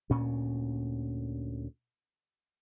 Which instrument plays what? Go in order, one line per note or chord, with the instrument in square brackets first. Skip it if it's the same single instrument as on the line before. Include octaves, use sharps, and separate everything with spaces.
[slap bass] D2 A#2 C#4